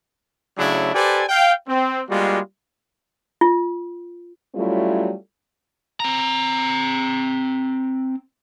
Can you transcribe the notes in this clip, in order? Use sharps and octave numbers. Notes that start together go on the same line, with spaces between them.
C#3 F#3 A3 D4 E4 G#4
G4 A4 B4 C5 D5 G#5
F5 G5
C4
G3 G#3 A#3 F4 F#4
F4
F#3 G3 A3 C#4 E4 F4
C4 A#5